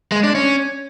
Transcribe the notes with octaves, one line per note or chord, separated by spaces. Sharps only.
G#3
D4
C#4